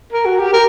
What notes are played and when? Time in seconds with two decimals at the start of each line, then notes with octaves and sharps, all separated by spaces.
0.13 A#4
0.25 F#4
0.39 G4
0.53 A#4